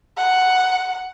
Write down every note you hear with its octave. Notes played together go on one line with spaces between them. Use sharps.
F#5